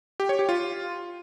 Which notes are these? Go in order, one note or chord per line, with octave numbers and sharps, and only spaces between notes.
G4
C#5
G4
F4